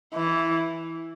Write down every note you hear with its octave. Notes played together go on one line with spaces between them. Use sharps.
E3